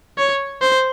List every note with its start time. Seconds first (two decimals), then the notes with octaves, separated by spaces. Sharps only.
0.18 C#5
0.61 C5